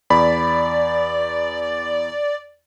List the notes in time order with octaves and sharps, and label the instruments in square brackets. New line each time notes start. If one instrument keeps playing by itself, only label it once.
[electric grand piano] E2 B5 [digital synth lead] D5